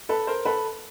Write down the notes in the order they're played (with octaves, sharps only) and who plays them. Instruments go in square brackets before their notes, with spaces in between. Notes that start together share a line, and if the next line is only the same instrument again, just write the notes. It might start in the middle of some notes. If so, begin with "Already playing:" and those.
[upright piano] A4 B4
A#4 C5
A4 B4